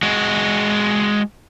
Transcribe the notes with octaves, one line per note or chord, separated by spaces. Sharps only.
G#3 F#4